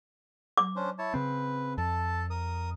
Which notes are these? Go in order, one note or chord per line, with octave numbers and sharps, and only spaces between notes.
D6
C#4 D4 C5
E4 C#5 A5
C#3 C4 B4
F2 A4 A5
A#4 D#6